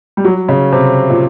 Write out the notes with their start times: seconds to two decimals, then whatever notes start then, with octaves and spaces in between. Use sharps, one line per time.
0.17 G3
0.25 F#3
0.49 C#3
0.72 C3
1.10 A#2